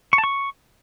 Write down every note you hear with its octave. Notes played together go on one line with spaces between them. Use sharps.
C#6
A5
C#6